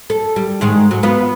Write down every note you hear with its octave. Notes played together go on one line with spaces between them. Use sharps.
A4
G3
G#2 D#3 G#3
F#3
B3 F4 B4